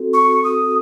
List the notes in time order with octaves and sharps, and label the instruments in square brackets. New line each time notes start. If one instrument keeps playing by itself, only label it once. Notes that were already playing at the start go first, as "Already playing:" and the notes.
Already playing: [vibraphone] C4 F#4 A4
[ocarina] C#6
D#6